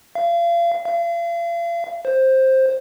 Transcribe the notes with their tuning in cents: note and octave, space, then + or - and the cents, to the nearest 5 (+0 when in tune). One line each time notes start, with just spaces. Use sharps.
F5 -35
F5 -40
C5 +10